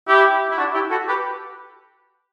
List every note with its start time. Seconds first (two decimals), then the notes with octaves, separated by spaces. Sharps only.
0.08 E4 G4
0.51 E4
0.57 D4 F#4
0.74 E4 G4
0.91 F#4 A4
1.08 G4 B4